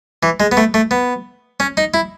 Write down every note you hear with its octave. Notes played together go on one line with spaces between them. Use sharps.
E3
G#3
B3
A3
A3
B3
C#4
D#4
E4